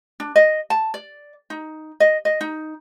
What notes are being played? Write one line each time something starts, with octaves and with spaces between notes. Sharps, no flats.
D4
D#5
A5
D5
D#4
D#5
D#5
D#4